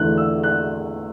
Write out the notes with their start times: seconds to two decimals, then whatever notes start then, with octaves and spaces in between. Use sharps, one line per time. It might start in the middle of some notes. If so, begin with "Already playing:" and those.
Already playing: E2 D3 A3 E4 F#6
0.17 E6
0.43 F#6